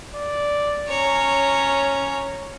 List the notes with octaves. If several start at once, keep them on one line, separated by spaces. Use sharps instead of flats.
D5
C#4 C#5 A#5